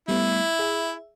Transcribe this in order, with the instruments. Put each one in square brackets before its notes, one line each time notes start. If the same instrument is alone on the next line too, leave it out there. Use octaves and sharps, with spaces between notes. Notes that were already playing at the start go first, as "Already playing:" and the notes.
[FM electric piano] G3 A3 B3 [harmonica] E4
[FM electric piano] G#4 E5